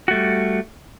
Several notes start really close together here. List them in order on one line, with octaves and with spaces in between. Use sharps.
F#4 A3 G3